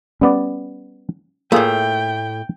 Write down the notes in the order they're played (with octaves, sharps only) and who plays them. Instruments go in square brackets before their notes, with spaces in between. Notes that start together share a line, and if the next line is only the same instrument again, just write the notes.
[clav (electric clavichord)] G3 B3 D5 [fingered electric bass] C#4
[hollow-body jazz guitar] A2 A3 [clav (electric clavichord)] A#3 F4 G#4 [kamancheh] G5